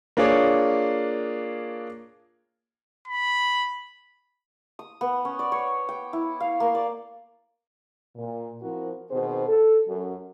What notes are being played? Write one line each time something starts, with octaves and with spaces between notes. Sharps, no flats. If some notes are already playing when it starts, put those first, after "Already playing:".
A#3 D4 F4 G#4 C#5
B5
D#6
B3
C#4
D5
C#5
G5
E4
F5
A#3
D5
A#2
F3 C4 E4 F#4 A#4
B2 D#3 C4 G#4 C5
A4
F#2